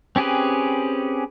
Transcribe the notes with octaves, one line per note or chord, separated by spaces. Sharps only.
C4 C#4 G4 G#4 B4